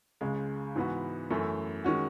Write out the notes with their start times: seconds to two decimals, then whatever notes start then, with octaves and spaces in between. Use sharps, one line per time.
0.21 C#2 C#3 G#3
0.76 G#2 E3 B3 F#4
1.30 F#2 E3 A3
1.84 D#3 G#3 C#4 F#4